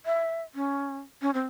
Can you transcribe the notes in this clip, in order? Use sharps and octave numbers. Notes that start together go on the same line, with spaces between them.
E5
C#4
C#4
C4